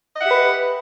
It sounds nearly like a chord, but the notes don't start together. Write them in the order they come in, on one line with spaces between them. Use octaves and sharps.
D#5 F#5 E5 G4 B4